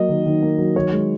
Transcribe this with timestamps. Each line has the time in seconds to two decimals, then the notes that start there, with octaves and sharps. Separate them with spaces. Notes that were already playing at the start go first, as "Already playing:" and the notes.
Already playing: F#3 A#3 D#5
0.09 D#3
0.26 D#3
0.42 A#3
0.58 F#3
0.75 D#3 C#5
0.92 G#3